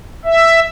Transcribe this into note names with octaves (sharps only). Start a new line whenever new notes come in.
E5